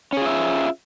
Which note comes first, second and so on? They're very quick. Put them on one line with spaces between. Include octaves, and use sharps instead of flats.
C#4 G#4 F4 E5